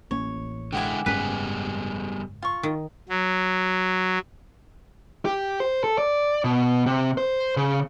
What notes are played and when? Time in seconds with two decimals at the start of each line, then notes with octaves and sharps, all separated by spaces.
0.11 A1 A#3 C#4 C#5
0.72 D3 G#3 E4 G4 F#5 G#5
1.06 F#1 G#2 G3 B3 C#4 G#4 B4
2.43 F4 C#6
2.63 D#3
3.09 F#3
5.25 G4
5.60 C5
5.84 A4
5.98 D5
6.44 B2
6.86 C3
7.18 C5
7.57 C#3